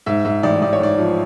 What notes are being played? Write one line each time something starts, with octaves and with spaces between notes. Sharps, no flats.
G#2 E5
G#2 E5
A1 D5
A1 D5
C#5
G#2 D5
F3